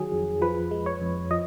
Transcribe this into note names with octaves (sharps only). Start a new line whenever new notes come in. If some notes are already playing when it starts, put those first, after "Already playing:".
Already playing: D#3 F#3 G#4
F2
F3 B4
G#3
C#5
F2
F3 D#5